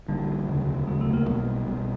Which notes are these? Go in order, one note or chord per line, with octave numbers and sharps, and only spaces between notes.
A#1 A#2 D3 G3
E1 D2 C#3 F#3
E1 D2 C#3 F#3 G#3
A3
A#3
B1 B2 G3 B3
B1 B2 G3 B3